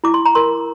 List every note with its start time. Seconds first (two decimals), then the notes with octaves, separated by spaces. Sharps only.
0.04 E4 D6
0.14 C6
0.26 A#5
0.35 A#4 C6